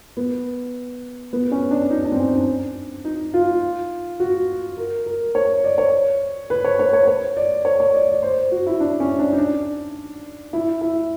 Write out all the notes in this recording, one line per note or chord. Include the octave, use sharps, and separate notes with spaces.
B3
B3
C#4
D4
D#4
D4
C4
C#4
D#4
D4
D#4
F4
F#4
A#4
A#4
C#5
D5
C#5
B4
C#5
C#5
C#5
C#5
D5
C#5
C#5
D5
D5
C5
C5
F#4
E4
D4
C#4
D4
D#4
D4
E4
E4